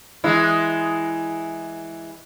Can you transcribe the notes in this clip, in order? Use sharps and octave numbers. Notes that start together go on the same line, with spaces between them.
E3 G#3 E4